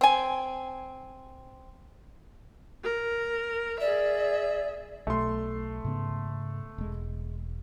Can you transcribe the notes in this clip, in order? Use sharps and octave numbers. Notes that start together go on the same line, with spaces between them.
C4 G#5
A#4
G#4 D5 E5
B1 A3 C6
G#2 C#3 B3
E1 G#3